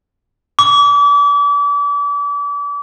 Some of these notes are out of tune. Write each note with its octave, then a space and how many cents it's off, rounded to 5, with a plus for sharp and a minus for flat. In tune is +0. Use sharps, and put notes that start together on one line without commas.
D6 -35